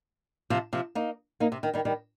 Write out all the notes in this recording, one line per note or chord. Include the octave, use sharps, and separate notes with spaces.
C3 F3
C3 F3
A#3 D#4
A#3 D#4
C3
D#3
D#3 G3
D#3 G3